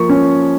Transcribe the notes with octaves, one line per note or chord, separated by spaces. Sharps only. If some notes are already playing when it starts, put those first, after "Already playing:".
Already playing: F3 A#3 C#6
C#4